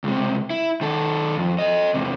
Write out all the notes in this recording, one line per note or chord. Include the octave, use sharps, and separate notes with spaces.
C#2 C3
E4
D#3 A4
F2
A4 D#5
E2 C3